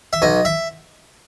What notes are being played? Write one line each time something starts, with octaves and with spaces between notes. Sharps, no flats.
E5
B1 D#5
E5